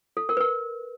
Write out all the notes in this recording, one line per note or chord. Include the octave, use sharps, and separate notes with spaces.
A4
A#4
B4
A#4